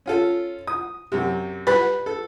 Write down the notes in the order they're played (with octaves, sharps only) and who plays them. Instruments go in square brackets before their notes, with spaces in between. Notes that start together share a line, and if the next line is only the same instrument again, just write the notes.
[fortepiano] C#4 F4 A4
D#6
F#2 C3
[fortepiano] G3 B5 F#6 [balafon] B4
[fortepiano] A4